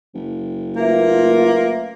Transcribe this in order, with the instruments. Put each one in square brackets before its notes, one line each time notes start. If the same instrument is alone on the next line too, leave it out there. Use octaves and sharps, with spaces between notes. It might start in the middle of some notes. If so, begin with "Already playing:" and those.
[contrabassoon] F#1
[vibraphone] A3 B4 E5 [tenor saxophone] A#3 [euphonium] F4